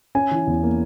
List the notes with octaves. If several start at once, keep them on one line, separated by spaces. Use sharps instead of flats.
C#4 G#5
E3
E2
A#3